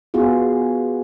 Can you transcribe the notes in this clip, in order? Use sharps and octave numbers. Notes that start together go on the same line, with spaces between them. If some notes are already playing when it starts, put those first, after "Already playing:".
B3 F4 F#4 G#4